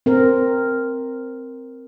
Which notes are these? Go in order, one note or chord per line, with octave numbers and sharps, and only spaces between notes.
C4 A#4